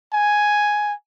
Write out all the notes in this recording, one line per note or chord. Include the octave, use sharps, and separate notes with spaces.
G#5